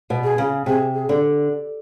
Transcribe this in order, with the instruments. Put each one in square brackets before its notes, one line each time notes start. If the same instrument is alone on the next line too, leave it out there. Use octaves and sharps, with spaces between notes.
[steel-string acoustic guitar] B2
[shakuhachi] G#4
[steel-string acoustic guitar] C#3
[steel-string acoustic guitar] C3 [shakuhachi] G#4
[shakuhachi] G#4
[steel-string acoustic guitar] D3